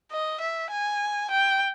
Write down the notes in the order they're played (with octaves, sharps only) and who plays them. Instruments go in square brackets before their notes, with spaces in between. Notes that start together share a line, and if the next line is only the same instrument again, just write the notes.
[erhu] D#5
E5
G#5
G5